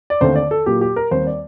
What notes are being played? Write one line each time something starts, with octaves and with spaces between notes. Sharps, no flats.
D5
D#2 D3 A3 C4 C5
D5
A4
A#2 F#3 A#3 G4
G4
A#4
D#2 D#3 G3 C4 C5
D5